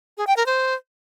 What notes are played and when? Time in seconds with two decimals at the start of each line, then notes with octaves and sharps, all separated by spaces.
0.18 G#4
0.27 G5
0.37 A#4
0.46 C5